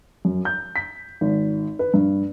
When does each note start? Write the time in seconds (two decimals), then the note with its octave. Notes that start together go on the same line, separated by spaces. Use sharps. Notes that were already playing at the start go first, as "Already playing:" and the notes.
0.25 F#2
0.45 G6
0.76 B6
1.21 G#1
1.79 B4
1.94 G2